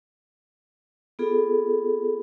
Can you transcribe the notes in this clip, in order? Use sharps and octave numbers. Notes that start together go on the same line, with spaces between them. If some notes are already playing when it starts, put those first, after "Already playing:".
B3 F4 G#4 A4